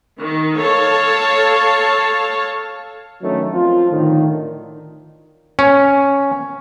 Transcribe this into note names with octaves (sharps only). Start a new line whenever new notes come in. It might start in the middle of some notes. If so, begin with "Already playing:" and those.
D#3
A4 C#5 F5 A5
D#3 F#3 A3 C#4 D4
F3 C4 F4
A2 D3 D#3
C#4